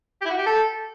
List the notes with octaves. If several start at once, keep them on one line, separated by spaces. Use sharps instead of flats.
G4
E4
F#4
G4
A4